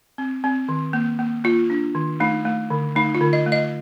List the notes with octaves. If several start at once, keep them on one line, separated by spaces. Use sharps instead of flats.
C4
C4
D#3
A#3
A#3
A#3 F4
D4
D#3
A3 D#4
A3
D3
A3 D#4
F4
D3
D#5
A3
D#5